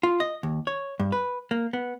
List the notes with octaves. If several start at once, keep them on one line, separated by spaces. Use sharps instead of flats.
F4
D#5
D#2
C#5
G2
B4
A#3
B3